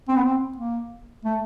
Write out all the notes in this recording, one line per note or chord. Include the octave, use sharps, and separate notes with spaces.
C4
B3
C4
A#3
A3